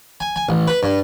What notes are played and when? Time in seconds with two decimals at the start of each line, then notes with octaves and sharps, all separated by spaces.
0.20 G#5
0.36 G#5
0.49 A1
0.68 B4
0.83 G2